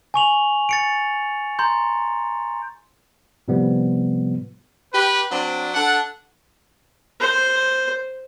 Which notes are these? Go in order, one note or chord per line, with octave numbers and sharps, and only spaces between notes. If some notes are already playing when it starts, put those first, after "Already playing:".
G#5 C#6 F7 F#7
A6 C#7 D7
A#5 C6 G6
A2 C3 F3 G3 B3
G4 B4
F#3 C4 D4
D4 A4 F#5
C5